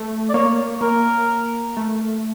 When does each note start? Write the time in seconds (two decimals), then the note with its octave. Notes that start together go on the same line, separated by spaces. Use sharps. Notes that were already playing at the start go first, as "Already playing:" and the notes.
Already playing: A3
0.29 D5
0.34 A#3 C#5
0.81 A#3 A#4
1.77 A3